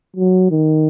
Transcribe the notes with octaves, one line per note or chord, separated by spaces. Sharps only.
F#3
D#3